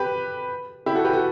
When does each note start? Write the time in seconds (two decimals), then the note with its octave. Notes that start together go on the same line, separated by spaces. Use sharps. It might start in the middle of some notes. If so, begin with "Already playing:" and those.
Already playing: G4 B4
0.86 E4 G4
0.95 F#4 A4
1.04 G4 B4
1.13 F#4 A4